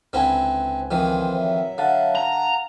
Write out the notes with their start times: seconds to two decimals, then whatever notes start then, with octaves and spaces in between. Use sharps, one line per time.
0.13 C#2 D3 C4 E4 B4 G#5
0.91 F2 D#3 E3 C5
1.35 F#3 E5
1.78 D3 F5 F#5 A5
2.15 A#5